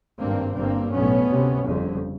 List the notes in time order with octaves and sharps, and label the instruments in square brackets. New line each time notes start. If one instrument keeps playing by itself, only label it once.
[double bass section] G#1 G2 A#3 C4
G1 G2 A#3 C4
B1 A2 B3 C#4
D2 C3
G1 F2 C#3